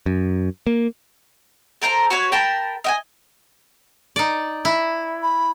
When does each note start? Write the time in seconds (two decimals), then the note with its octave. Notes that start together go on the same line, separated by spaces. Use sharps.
0.06 F#2
0.67 A#3
1.82 A4 A#4 C5 A#5
2.10 F#4 B4 C#5
2.32 A#4 G5 A5 B5
2.84 D#5 G5 G#5
4.16 D#4 D5
4.65 E4
5.22 B5